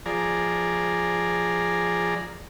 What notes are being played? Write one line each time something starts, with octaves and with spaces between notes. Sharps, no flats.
F3 G#4 D5 A#5